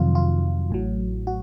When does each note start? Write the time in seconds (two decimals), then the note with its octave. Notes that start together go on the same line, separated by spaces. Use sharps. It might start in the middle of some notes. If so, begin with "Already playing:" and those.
Already playing: F2 C3 D#3 F#3 F4
0.15 F4
0.70 A1 A2 F#3
1.27 F#4